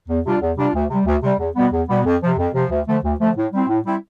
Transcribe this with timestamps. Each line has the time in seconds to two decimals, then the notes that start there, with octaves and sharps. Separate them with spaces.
0.08 E2
0.24 C3 G3 D4 F4
0.41 E2
0.57 C3 G3 D4 F4
0.74 D2
0.89 C3 G3
1.06 D2
1.23 C3 G3
1.39 E2
1.56 B2 G3 B3
1.73 E2
1.88 B2 G3 B3
2.05 F2
2.21 C3 F3
2.37 F2
2.54 C3 F3
2.70 D2
2.87 D3 F3 A3
3.03 D2
3.19 D3 F3 A3
3.37 A2
3.53 G3 C4 E4
3.68 A2
3.85 G3 C4 E4